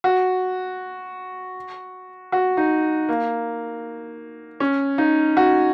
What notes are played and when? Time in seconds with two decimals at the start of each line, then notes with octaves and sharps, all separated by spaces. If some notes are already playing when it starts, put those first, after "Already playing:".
0.04 F#4
2.32 F#4
2.57 D#4
3.09 A#3
4.60 C#4
4.98 D#4
5.37 F#4